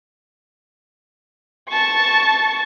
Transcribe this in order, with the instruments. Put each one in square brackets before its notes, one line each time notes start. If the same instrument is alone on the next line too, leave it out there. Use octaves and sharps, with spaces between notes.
[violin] A5 C#6